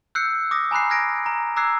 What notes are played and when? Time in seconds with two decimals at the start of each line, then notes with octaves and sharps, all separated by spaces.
0.15 E6 F#6 G6 C7 C#7
0.51 D6 D#6 A#6
0.71 G#5 A#5 B5 F#6 C7
0.90 F6 F#6 G#6 A#6 C7 D7
1.26 A#5
1.56 A#5 D6 E6 F#6 G#6 C7